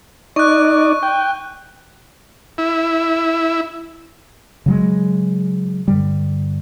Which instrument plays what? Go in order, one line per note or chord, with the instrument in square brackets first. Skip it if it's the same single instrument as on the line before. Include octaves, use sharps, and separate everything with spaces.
[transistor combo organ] D#4 D5 [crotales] C#6 F#6
[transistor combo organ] G5
E4
[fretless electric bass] C#3 F#3 G#3
G2 D3 G3